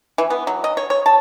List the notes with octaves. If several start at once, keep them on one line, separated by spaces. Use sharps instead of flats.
E3
B3
F#3
D#5
C#5
C#5
A5